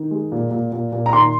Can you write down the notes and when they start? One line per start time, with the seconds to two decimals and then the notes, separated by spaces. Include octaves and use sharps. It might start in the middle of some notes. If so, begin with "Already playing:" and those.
Already playing: D#3
0.11 G#3
0.32 A#2
0.51 A#2
0.72 A#2
0.92 A#2
1.06 A#5
1.12 D#3 C6